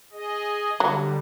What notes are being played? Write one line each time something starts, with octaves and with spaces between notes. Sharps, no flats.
G#4 D#5
D3 F#3 G3